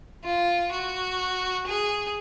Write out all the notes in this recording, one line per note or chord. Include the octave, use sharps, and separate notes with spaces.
F4
F#4
G#4